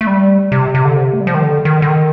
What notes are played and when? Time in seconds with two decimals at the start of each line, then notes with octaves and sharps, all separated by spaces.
0.01 A3
0.07 G3
0.52 C3
0.75 C3
0.85 D3
0.96 C3
1.13 A3
1.21 G3
1.27 F3
1.34 D#3
1.43 D3
1.65 D#3
1.82 D3
1.87 D#3